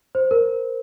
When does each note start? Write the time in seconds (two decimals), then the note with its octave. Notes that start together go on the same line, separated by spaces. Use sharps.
0.15 C5
0.31 A#4